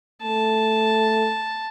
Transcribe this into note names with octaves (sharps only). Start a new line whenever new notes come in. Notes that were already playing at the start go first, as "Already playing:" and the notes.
A3 A5